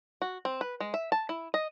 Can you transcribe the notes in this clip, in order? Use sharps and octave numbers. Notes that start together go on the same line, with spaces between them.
F#4
C4
B4
G#3
E5
A5
E4
D#5